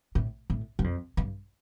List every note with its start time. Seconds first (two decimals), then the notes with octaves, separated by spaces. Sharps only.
0.15 A2
0.50 A2
0.79 G2
0.84 F2
1.17 G2